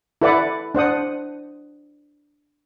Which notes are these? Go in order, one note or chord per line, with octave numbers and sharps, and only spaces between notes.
E4 A4 B4 D5 F#5 D6
D4 C5 F#5 D#6